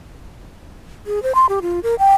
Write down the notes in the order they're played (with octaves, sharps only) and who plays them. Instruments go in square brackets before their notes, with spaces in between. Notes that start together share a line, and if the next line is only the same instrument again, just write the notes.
[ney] G#4
C5
C6
G4
F4
A#4
G5